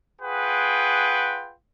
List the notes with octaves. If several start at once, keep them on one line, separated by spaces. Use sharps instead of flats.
F4 G#4 B4 F#5 G5